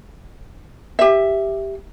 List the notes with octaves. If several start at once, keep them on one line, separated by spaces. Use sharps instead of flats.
G4 E5